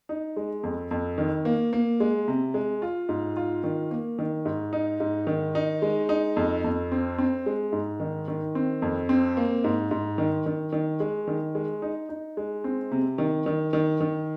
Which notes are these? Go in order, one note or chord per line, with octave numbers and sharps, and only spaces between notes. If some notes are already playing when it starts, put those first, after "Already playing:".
D#4
G#3
F2
F2
D#3
A#3
A#3
G#3
C3
G#3
F4
G#2
F4
D#3
A#3
D#3
G#2
D#4
G#2
D#3
D#4
G#3
D#4
F2
F2
C4
C4
G#3
G#2
D#3
D#3
C4
F2
C4
A#3
G#2
G#2
D#3
D#3
D#3
G#3
D#3
G#3
D#4
D#4
G#3
C4
C3
D#3
D#3
D#3
D#3